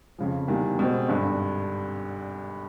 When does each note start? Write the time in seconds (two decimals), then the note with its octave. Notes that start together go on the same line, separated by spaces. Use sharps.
0.18 F2 C#3 F3
0.48 E2 C3 D#3 G3 A#3
0.79 B2 G#3 C4
1.08 G#1 G2 D3